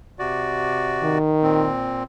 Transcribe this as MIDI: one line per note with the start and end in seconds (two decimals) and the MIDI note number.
0.19 1.18 48
0.19 1.18 66
0.19 1.18 74
1.03 1.68 51
1.43 2.04 46
1.43 2.04 60